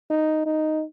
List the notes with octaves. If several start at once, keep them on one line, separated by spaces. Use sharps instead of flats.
D#4
D#4